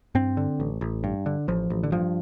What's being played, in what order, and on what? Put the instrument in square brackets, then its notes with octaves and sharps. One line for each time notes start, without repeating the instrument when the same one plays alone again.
[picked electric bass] G2 C4
D3
A1
A1
G2
D3
A1 F3
A1
D3
G2 F3